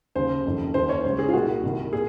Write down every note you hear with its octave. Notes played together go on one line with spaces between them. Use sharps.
D#2 C#3 C5
F#1 F2 D#3
D#2 D#3 C5
C#5
C#2 C#3 C5
G#4
F4
C2 A#2 F#4
C2 C3 D#3
A#2 G#4